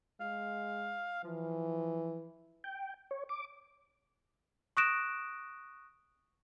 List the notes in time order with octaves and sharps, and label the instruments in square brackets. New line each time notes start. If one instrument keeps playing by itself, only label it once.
[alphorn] G#3 [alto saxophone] F5
[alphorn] E3 [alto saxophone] F3
[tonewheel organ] G5
C#5
D6
[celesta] C#6 D#6 F#6 A#6 D7 E7